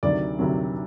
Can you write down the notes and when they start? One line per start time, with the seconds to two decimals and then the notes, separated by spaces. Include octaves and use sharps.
0.03 D2 C3 D#3 F#3 D5
0.39 D2 C3 D#3 F#3